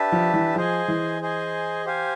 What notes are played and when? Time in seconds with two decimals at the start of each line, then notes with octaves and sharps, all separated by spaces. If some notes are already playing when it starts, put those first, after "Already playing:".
Already playing: D4 G4 B4 E5 A5
0.12 F3
0.34 E3
0.56 F3 G#4 C5 D#5 G#5
0.88 E3
1.21 G#4 C5 D#5 G#5
1.85 G4 C5 F5 G#5